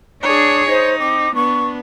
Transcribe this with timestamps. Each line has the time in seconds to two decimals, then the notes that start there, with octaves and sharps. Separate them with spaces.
0.23 D4 G#4 C#5
0.69 D#4 C5
0.99 C4 D6
1.35 B3 D4 C#6